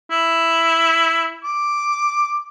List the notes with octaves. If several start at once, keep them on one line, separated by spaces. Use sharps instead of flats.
E4
D6